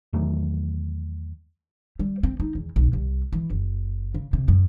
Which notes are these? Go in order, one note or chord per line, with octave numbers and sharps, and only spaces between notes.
E2 D#3 F#3 A3
G3
C4
D#4
E2
B1
C2
E3
F#1
C#3
C3
F#2